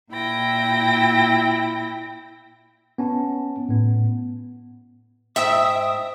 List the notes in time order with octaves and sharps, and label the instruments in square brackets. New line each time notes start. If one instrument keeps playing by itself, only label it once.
[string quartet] A#2 E4 G5 A#6
[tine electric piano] B3 C#4 A5
A2 B3
[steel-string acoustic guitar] G#2 G5 [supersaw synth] E5 [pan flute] D#6